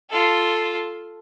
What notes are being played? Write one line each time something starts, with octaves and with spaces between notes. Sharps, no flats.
F4 A4